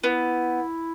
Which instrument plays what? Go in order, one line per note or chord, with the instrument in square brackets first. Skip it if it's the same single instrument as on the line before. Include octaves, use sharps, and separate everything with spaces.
[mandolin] B3 [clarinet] E4